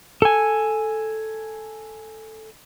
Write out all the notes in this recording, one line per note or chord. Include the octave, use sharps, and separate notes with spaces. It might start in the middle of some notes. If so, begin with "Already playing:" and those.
A4 G#5